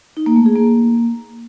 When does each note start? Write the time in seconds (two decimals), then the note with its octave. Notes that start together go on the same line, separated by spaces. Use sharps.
0.17 D#4
0.26 A#3
0.36 A3
0.46 G#4
0.56 A#3